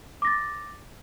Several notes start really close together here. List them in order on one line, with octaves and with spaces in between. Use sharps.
D6 A#6 A6